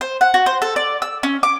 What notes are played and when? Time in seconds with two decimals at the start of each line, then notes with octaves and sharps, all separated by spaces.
0.01 C5
0.21 F#5
0.34 F#4
0.46 C5
0.62 A4
0.76 D5
1.02 E6
1.23 C#4
1.43 D6